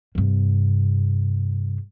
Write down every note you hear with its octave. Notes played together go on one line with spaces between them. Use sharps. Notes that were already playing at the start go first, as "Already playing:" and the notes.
G2 C3